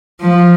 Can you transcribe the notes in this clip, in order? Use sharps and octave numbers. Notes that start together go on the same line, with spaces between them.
F3